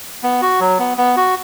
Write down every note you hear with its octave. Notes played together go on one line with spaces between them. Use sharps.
B3
F#4
F#3
B3
B3
F#4